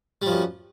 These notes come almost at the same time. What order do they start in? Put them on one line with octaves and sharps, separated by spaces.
G3 F3 F#2